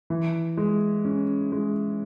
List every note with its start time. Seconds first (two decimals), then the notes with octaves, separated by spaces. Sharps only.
0.10 E3
0.57 G#3
1.05 C#4
1.52 G#3